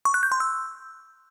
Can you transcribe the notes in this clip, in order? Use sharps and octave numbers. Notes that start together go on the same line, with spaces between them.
C#6
F#6
G6
C6
E6